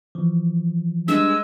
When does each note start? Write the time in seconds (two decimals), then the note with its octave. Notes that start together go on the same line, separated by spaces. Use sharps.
0.15 E3 F3
1.08 G2 G#3 E6